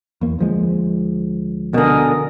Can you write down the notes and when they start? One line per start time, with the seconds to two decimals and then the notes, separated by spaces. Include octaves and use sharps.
0.21 E2 A#3
0.39 D2 F3 G#3
1.74 B2 D3 A#4 G#5 D#6